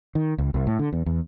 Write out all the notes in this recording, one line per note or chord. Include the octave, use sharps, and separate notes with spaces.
D#3
C#2
C2
A2
D3
E2
E2